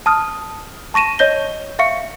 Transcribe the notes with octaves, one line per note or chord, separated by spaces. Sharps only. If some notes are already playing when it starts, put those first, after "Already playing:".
A5 D#6 F6
A5 C#6 A#6 D#7 E7
C#5 D#5 G6 A#6 G7
E5 F5 C#6 C#7